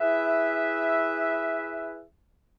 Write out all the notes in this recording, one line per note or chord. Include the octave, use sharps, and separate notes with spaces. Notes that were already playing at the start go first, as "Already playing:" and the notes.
E4 G#4 B4 E5